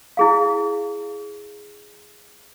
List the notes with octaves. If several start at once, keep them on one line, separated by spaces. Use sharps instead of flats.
E4 G#4 F5